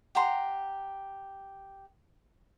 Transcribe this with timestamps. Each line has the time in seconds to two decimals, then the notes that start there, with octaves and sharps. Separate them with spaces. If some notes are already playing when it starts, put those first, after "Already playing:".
0.15 G4 F#5 A#5 C6